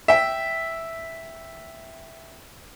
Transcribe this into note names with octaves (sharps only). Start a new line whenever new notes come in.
E5 G5